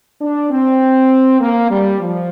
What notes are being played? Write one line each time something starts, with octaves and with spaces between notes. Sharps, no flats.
D4
C4
A#3
G3
F3